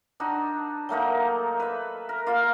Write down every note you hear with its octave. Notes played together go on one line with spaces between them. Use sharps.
D4 D#4 F#4
F#3 A3 A#3 D#4
B4 E5
A#4
A#3 F4 F5